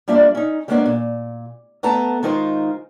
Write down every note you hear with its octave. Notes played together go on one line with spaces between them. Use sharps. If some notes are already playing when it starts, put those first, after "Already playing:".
G3 A#3 D4 F4 D5 E5
C#4 D#4
G3 G#3 A#3 B3 C#4 D4
A#2
A3 B3 A4 A5 A#5
D#3 G#3 D#4 F4 A#4 C5